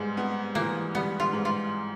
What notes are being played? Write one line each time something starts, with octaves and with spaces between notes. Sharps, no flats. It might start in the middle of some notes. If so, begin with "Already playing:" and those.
Already playing: G#2 G3 G#3 B3
B3
E3 A#3
G3 B3
F4
G#2
F4